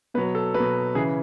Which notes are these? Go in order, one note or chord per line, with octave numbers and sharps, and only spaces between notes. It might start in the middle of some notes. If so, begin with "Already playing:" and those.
B2 F#3 B4
A4
F#3 B4
B2
C#3 E3 G#4